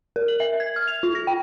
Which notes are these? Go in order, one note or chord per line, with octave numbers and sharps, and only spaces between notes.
A#4
F#7
E5
G#6
F6
F7
F4
A#6
G5